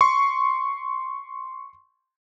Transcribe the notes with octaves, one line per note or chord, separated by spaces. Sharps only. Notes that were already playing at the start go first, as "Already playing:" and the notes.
C6 C#6